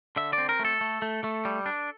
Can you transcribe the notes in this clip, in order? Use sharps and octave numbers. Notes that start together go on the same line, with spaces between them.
D3 E5
C4 D5
A#4
A3
A4
A3
A3
A3
G3
D4